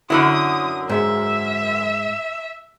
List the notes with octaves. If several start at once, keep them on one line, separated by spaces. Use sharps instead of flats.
F#2 D3 F#3 E4 D#6
G#2 E5